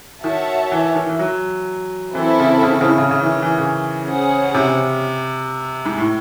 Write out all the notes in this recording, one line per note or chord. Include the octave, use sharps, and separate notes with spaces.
D#3 F#4 C#5 E5 A5
E3
D#3
E3
F#3
E3 C4 E4 A4
C#3
C#3
D#3
C#3
D#3
C#3
C#3
E3
D#3
E3
C#3
C#4 G#4 C5 F#5
C3
G#2
A2